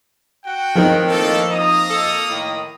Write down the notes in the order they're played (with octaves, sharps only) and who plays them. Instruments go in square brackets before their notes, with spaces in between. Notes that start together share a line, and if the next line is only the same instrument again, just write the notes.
[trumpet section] F#4 F#5 G5
[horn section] A2 D#3 [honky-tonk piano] F3 C4 D#4
[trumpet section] A3 A#3 A4
A#3 A#5 D#6
[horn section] A4
A2 D#3